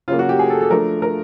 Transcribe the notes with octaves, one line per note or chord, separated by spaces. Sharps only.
C#3 F#3 A#3 F4
F#4
G4
G#4
A4
A4
F3 A3 D4 A#4
A#4